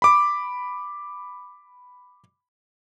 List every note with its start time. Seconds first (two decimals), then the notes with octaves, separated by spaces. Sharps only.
0.02 B5 D6